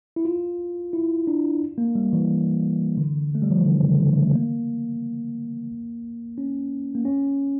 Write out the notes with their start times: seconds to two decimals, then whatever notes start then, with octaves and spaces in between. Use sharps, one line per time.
0.16 E4
0.25 F4
0.93 E4
1.27 D4
1.78 A#3
1.95 G3
2.13 E3
2.97 D3
3.35 A3
3.42 G3
3.51 F3
3.58 E3
3.65 D3
3.83 C#3
3.99 D3
4.16 A3
4.33 A#3
6.38 C#4
6.95 A#3
7.05 C#4